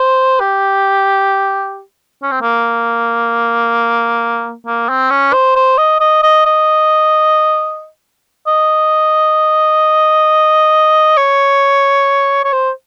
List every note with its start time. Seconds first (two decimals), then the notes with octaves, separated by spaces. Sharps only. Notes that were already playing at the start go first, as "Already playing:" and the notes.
Already playing: C5
0.40 G4
2.23 C#4
2.31 C4
2.41 A#3
4.66 A#3
4.89 C4
5.10 C#4
5.33 C5
5.56 C5
5.78 D#5
6.00 D#5
6.23 D#5
6.46 D#5
8.47 D#5
11.17 C#5
12.44 C#5
12.53 C5